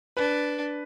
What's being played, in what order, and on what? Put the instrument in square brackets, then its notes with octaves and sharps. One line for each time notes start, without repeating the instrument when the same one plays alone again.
[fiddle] D4 [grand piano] B4